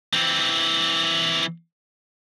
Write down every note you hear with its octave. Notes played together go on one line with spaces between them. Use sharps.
E3 C4